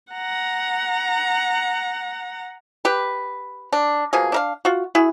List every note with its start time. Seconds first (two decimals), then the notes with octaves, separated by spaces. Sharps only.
0.12 F#5 A#5
2.85 G4 B4
3.73 D4
4.13 B2 F3 A#3 G#4
4.32 D4 A#4 F5
4.65 F4 F#4
4.95 E4 F#4 G#4